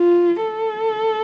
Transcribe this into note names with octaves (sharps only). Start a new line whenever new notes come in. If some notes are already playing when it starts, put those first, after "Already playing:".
Already playing: F4
A4